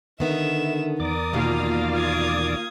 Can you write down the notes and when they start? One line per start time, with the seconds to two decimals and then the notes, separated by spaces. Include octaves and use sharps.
0.20 D3 D#3 B3 E5 E7
1.00 E2 A#4 D5 D6 D#6
1.33 B2 D#3 A#3 F4 F5
1.93 D#6 G#6